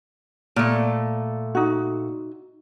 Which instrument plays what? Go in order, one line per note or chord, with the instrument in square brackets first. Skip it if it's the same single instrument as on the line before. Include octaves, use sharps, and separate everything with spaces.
[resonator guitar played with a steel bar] A#2 A3
[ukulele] D#4 F#4